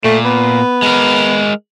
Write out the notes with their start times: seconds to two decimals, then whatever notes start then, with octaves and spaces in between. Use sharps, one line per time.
0.04 A#2 A3
0.25 B3
0.82 G#3 A#4